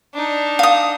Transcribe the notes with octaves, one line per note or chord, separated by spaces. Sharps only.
D4 D#4
F5 D#6